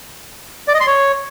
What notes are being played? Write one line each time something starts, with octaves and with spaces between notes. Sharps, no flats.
D5
D#5
C6
C#5